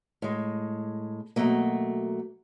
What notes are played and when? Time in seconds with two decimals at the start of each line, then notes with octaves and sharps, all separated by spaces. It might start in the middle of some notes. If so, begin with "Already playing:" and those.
0.22 A2 G#3
1.36 B2 F3 F#3 A3 A#3